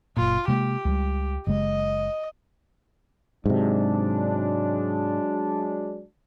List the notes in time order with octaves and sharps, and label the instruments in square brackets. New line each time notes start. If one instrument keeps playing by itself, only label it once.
[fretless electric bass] F#1 A#2 [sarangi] F4
[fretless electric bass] C3 G#3 A#3 [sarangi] G4
[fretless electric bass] C#2 G3
[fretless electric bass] F#1 C#3 G#3 [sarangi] D#5
[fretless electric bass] G#2 C3 [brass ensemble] F#3 G#3 D4